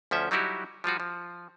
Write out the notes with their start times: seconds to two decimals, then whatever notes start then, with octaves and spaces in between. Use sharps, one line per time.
0.11 D2 F3 C#4 E5
0.31 F#3 G3 D#4 E4 F#4 G4
0.84 F3 G3 F4 F#4
1.00 F3